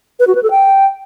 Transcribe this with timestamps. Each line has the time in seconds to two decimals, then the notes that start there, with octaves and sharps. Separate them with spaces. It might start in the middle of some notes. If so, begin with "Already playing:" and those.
0.20 B4
0.27 F#4
0.35 B4
0.43 A4
0.51 G5